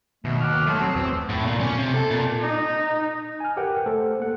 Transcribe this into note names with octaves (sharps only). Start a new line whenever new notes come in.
D#2 B2 A3
G5 D6 F6 F#6
F#3 A3 C#5 A5 C6 D#6
F#3 C4 C#5
E2 B4 E6
A2
A#2
C#4
C3
A4
A#2
D#4
G#5 F6
G4 A#4 B4 F#5 G5
A3 A4 C5
A#3 F#5